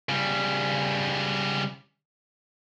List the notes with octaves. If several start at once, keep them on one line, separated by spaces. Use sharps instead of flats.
C#3 G3